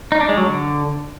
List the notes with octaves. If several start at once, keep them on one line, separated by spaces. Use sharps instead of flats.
D#4
D4
G#3
F#3
D3